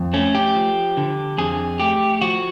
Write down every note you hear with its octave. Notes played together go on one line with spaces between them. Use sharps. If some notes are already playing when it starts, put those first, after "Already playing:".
Already playing: F2
A3 C#4
G4
F3
D3
F2 G#4
A3 G4
F3 F#4